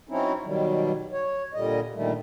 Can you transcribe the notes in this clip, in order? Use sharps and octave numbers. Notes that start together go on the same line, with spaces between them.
F#3 C4 C#4 D#4 E4
B2 D#3 F#3 G3
C#5
A#2 D3 G3 D#5
A#2 D3 D#3 G3 A3